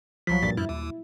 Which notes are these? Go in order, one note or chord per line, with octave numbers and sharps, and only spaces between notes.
C2 F3 F#3 B6
G2 A#2 A6
F#2 E4
D#2